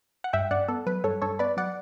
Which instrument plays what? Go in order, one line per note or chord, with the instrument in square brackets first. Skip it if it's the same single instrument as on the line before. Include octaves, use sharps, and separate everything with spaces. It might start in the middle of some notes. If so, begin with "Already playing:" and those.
[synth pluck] F#5
G2 E5 G5
G2 D5 F#5
B3 A4
F#3 B4
G2 A4 C#5
G2 A4 C#5
B3 B4 D5
F#3 D5 F#5